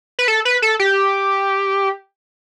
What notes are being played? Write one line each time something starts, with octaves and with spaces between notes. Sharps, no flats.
B4
A4
B4
A4
G4